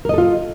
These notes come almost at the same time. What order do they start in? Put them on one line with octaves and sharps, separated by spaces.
A#4 D#5 A4 F4